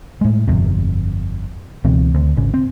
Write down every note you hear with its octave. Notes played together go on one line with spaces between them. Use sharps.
A2 G#3
G1 F2 C3
C#2 B2 E3 C4
D2
G#1 C#3
C4